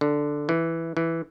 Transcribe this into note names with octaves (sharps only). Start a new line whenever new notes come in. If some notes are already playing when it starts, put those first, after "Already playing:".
D3
E3
E3